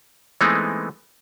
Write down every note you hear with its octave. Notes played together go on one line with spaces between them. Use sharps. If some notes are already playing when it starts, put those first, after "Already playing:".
E3 G#3 A3 B3 C4 D#4